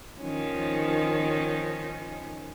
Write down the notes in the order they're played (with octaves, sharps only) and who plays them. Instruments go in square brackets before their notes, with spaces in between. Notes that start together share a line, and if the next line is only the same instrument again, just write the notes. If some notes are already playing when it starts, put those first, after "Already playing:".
[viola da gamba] D#3 F3 C#4